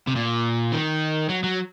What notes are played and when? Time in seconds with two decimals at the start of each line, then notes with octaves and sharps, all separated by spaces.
0.07 C3
0.16 A#2
0.73 D#3
1.29 F#3
1.44 F#3